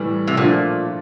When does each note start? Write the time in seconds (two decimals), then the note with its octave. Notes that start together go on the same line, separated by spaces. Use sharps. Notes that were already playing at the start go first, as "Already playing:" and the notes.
Already playing: A2 E3 G3
0.28 C3
0.37 A#2 F3 A3 D4 F4